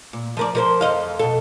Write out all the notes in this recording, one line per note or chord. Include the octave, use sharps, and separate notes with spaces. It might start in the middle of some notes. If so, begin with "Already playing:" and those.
A#2
F3 A#4 D5
F3 A#4 C5
F2 D#5 F5
B2 A4